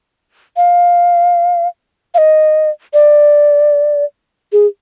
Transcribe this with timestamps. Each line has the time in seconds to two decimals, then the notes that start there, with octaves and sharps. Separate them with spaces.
0.57 F5
2.14 F5
2.18 D#5
2.94 D5
4.52 G#4